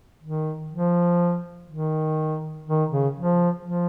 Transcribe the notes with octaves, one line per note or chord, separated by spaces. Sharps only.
D#3
F3
D#3
D#3
C#3
F3
F3